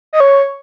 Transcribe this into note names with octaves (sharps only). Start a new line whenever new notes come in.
D#5
C#5